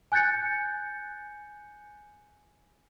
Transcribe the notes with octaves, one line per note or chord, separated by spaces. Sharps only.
G#5 F#6 G6 A6 C#7